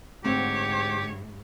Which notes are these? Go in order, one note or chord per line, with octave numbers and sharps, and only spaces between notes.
D2 G#2 C4 G4 C#5 F#5